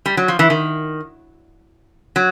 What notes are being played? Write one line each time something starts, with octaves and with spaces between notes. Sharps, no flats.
G3
F#3
F3
E3
D#3
F#3